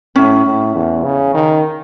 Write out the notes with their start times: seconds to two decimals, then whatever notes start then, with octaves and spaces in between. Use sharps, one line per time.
0.15 A2 C#4
0.45 A2
0.75 E2
1.04 C#3
1.34 D#3